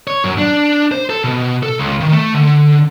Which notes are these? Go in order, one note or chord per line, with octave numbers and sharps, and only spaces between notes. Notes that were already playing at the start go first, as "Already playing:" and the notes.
C#5
F#2
D4
C5
A4
B2
A4
C#2
D#3
A3
D3